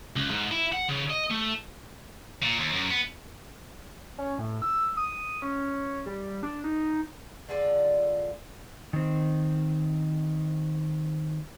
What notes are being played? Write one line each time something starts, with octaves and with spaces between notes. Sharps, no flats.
C#2
G#2
E4
F#5
C#3
D#5
A3
A#2
D#2
F#2
B3
C#4
A2
E6
D#6
C#4
G3
D4
D#4
D3 G#3 F4 D5
D#3 C4